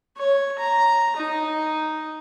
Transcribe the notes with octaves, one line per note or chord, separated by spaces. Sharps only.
C#5
A#5
D#4